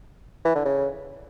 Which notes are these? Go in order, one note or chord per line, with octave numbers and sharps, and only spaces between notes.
E3
D3
C#3